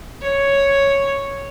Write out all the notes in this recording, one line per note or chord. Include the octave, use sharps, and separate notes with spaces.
C#5